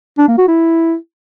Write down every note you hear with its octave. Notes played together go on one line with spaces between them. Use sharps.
D4
A#3
F#4
E4